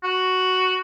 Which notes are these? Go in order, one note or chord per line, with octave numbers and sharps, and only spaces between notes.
F#4